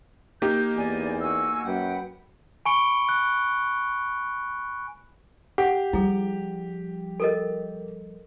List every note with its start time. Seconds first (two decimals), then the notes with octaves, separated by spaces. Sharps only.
0.42 A#3 D#4 G4 G6
0.75 E2 D5 G#5
1.21 F#4 G#5 E6
1.65 F#2 B4 F#5 G5
2.66 G#5 B5 C#6 C#7 D7 G7
3.09 F#6
5.58 G4 F#5
5.93 F3 G3 E4 G#4
7.20 A4 A#4 D#5